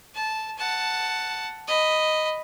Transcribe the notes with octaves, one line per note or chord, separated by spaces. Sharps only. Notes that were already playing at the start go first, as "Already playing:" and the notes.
A5
F#5 A5
D#5 B5